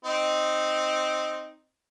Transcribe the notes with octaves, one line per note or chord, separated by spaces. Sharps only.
C4 D#4